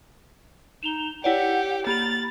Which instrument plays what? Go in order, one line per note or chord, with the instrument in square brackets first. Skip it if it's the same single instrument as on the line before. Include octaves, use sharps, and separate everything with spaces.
[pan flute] D#4 [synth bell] E7 F7 G7
[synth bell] E4 C#5 D5 [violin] G4 [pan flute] F#5
[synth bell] A#3 G4 F7 [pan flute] B5 [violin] A6